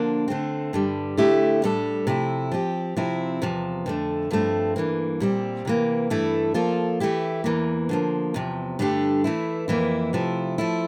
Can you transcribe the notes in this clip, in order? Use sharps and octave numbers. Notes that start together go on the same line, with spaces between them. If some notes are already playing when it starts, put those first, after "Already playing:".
Already playing: D3 F3 A#3 D4
D3 A3 C4
G2 D3 G3
D3 A3 E4 G4
A2 G3 D4 A4
C3 F3 A3 E4
F3 C4 G4
C3 F3 C4 E4
E2 C3 F3
F2 D3 A3
G2 F3 A3 C4
G2 E3 A#3
A#2 G3 C4
C3 E3 A#3
G2 E3 A3 E4 A4
F3 A#3 F4 A4
E3 A3 E4 G4
E2 E3 A#3
D3 F3 A#3
E2 C3 F3
G2 D3 A3 D4 G4
E3 A3 E4
F2 E3 A#3 E4
C3 F3 A3 E4
F3 A3 E4